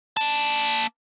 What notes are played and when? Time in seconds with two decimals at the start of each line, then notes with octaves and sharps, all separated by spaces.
0.17 A#3 A5